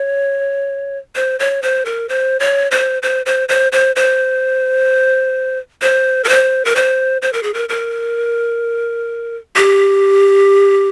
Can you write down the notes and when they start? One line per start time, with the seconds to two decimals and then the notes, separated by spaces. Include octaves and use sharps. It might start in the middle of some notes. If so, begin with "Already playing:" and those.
Already playing: C#5
1.15 C5
1.39 C#5
1.62 C5
1.85 A#4
2.09 C5
2.40 C#5
2.71 C5
3.03 C5
3.26 C5
3.49 C5
3.72 C5
3.96 C5
5.82 C5
6.24 A#4
6.29 C5
6.65 A#4
6.76 C5
7.22 C5
7.33 A#4
7.43 G#4
7.54 A#4
7.69 A#4
9.56 G4